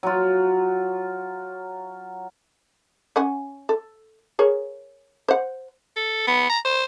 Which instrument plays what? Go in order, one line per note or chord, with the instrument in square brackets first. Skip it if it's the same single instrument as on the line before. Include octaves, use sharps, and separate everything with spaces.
[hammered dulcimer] F#3 F4
[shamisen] C#4 F#5 G#5
A4
G#4 A#4 C#5
C5 F#5
[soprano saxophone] A4
B3
A#5
C5